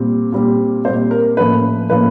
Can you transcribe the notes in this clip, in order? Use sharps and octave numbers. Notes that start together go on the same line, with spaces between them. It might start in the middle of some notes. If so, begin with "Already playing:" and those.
Already playing: A#2 G3 C4
A#2 G3 C4
A#2 G3 C4 C5
A#4
A2 F3 A#3 C#4 B4
A2 F3 A#3 C#4 B4